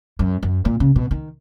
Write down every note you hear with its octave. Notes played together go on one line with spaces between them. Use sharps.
F#2
F#2
A#2
C#3
B2
D#3